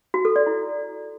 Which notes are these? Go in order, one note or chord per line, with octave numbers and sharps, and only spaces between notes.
F#4
A4
D5
E4